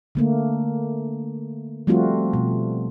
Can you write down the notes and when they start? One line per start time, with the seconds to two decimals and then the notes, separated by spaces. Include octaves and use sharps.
0.15 D3 A3 A#3
1.87 F3 G3 A3 C4 F4 F#4
2.33 B2